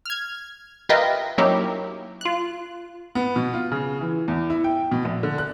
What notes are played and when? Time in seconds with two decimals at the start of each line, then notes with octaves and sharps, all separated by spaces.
0.06 F6 G#6
0.89 F4 G4 A#4 B4 D#5 E5
1.38 F#3 A#3 C#4 D#4 E4 G4
2.21 F4 F#6
3.15 B3
3.36 B2
3.54 F4
3.72 C#3
4.01 E3
4.28 E2
4.50 E4
4.64 G5
4.92 B2
5.05 A#1
5.23 D3
5.38 F#6